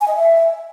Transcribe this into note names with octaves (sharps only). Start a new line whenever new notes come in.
G#5
D#5
E5